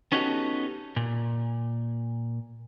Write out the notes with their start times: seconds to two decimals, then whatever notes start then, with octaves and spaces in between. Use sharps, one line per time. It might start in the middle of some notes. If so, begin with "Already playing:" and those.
0.12 B3 C#4 D#4 F#4 G4 A4
0.96 A#2